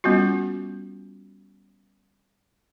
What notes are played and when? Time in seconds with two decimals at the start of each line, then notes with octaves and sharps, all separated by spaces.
0.04 G3 B3 C#4 F4 F#4